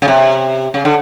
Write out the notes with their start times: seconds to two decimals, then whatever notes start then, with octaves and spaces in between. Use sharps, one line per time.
0.02 C#3
0.08 C3
0.74 C#3
0.85 D3